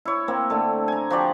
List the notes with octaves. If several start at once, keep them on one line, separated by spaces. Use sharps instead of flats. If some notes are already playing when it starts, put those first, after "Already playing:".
E4 C#5
A#3 C4
D3 A3
G#5 A#5
F3 F#4 G4 D5